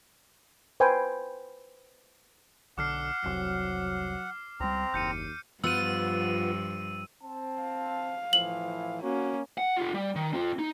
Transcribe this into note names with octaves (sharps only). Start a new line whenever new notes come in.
B4 C5 G5 G#5
B1 D3 F#5 D6 F6 C7
F1 C2 F#3 C7
C#2 G3 C4 A#5
F#1 D#2 G6 C#7 D#7
G2 F3 B3 F4 F#5 E6 D#7
C4 A5
F5
A2 E3 F3 F#7
A#3 C#4 F#4
F#5
F4 G4
G3
D#3
C4 F4
D#4